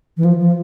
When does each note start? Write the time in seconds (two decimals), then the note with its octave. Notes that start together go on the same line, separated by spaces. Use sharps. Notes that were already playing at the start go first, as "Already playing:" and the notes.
0.17 E3
0.25 F3
0.40 F3